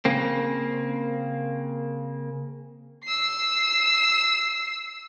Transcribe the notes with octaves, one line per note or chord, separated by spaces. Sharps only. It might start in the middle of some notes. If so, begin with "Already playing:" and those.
C#3 A#3 C4
E6 C7